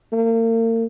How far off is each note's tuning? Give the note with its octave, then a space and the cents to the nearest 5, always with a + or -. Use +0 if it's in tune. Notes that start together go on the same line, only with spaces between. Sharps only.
A#3 -40